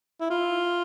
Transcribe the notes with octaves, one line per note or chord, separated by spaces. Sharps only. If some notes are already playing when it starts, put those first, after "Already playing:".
E4
F4